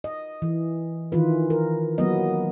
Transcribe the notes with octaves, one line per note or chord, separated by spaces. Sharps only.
D#5
E3
D#3 E3 F4 B4
A#4
F#3 A#3 B3 D#5